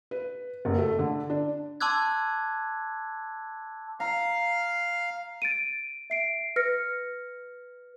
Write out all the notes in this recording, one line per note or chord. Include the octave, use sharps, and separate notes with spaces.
B4
F#1
A3
D3
D4
A5 C6 D6 E6 F#6 G#6
F5 A#5
A6 D7 D#7
E5 C7 D7
B4 F6 A#6 C#7